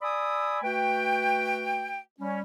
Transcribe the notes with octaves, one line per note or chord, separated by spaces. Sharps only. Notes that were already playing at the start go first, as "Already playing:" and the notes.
D5 G#5 B5 D#6 E6
A3 F#4 B4 G5
G3 C#4